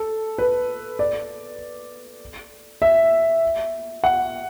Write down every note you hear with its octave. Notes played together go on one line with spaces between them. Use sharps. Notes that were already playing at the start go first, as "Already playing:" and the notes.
Already playing: A4
B4
D5
E5
F#5